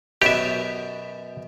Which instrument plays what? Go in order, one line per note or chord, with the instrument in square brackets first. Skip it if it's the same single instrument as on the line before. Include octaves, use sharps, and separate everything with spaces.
[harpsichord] F#2 B2 B3 [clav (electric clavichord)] G4 E5